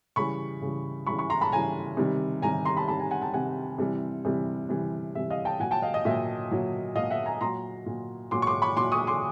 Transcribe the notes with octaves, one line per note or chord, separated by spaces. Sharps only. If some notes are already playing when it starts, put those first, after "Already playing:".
C#3 E3 G3 B5 C#6
C#3 E3 G3
C#3 E3 G3 B5 C#6
B5 C#6
A#5 C6
A5 B5
C#3 E3 G3 G#5 A#5
C3 D#3 G3
C3 D#3 G3 G#5 A#5
A#5 C6
A5 B5
C3 D#3 G3 A5 B5
G#5 A#5
F#5 G#5
G5 A5
C3 D#3 G3 F#5 G#5
C3 E3 G3
C3 E3 G3
C3 E3 G3
C3 E3 G3 E5
D#5 F5
G5 A5
A#2 F#3 F#5 G#5
G5 A5
D#5 F5
D#5
A#2 F#3 E5
A#2 F#3
A#2 F#3 D#5 F5
E5 F#5
G#5 A#5
A#2 F#3 A#5 C6
A#2 F#3
A#2 F#3 C6 D6
C#6
C6 D6
B5 C#6
A#2 F#3 C6 D6
C#6 D#6
C6 D6